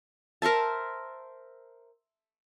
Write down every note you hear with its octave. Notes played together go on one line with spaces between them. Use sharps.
A#4 C5 E5 A5